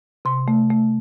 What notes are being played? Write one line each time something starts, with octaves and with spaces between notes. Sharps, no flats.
C3 C6
A3
A3